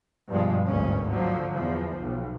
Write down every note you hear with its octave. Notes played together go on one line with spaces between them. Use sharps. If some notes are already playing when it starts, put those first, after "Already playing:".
G2 B2 F3 G#3
G#1 D2 G2 A#2 C#4
D3 F3 F#3
E2 F3
B1